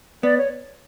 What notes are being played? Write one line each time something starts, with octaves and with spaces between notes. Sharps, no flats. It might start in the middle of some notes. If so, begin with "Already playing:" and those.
B3 D5
C#5